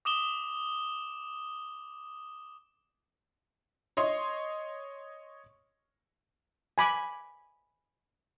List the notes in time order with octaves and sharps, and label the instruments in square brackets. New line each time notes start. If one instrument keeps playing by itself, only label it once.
[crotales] D6 D#6 E7 G7
[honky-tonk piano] C#5 D#5 C6 C#6
[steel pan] G#5 B5 D6